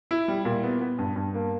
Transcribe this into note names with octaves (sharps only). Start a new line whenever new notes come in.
E4
G3
A#2
B3
B3
G2
G2
A#3